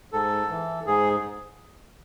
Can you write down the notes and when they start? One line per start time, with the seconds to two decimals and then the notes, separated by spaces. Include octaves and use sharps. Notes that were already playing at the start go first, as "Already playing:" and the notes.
0.12 G#2 A4
0.50 E3
0.86 G#2 G#4